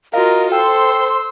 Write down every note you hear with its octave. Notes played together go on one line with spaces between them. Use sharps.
F4 F#4 A#4 D#5 F5
A4 C5 G5 C6 E6